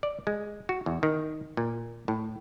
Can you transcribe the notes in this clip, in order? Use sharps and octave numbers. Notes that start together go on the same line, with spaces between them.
D5
G#3
F#4
E2
D#3
A#2
A2